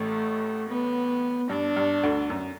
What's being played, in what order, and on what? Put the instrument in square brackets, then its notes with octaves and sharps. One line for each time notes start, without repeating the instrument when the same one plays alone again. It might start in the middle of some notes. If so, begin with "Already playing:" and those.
Already playing: [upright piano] A1 A2 [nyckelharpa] A3
[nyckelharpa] B3
[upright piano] G2 [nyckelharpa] D4
[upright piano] G2
D2 D3
F#2